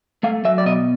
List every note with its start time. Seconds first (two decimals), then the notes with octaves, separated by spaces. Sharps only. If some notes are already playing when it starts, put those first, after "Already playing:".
0.23 A3 F5
0.45 F#3 E5
0.58 D5
0.66 B2 D#5